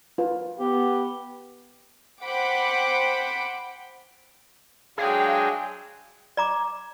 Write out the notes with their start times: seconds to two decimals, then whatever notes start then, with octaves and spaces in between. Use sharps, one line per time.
0.18 F4 B4
0.60 B3 G4
2.23 C5 F#5 G5 B5 D6
4.98 F#3 G#3 D4 G#4 F5 G5
6.37 D5 A#5 D6